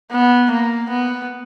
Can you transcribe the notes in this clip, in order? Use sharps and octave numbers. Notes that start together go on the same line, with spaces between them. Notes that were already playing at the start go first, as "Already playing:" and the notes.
B3
A#3
B3